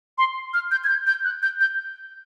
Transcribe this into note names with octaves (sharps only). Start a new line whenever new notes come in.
C6
F6
G6
G#6
G6
G6
F#6
G6
G6